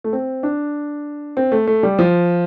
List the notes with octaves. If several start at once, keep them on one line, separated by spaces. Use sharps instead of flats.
A3
C4
D4
C4
A3
A3
G3
F3